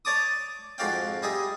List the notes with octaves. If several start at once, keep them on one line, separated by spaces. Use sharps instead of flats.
C#5 D5 A5 D6 D#6
F2 G#2 F#4 D5 F5 G5
G3 D#4 G#4 E5